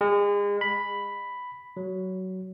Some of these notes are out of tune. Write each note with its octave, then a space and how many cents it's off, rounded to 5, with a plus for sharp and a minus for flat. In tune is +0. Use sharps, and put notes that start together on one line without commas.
G#3 -35
B5 +5
F#3 +15